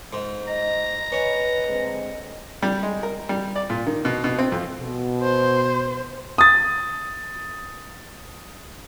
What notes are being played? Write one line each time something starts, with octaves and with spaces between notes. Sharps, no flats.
G#2
D#5 A#5
C#4 B4 D#5
D3 G#3 C4
G3
G#3
A#4
G3
D5
A#2
D#3
B2
B2
C4
F2
B2
C5
D#6 A6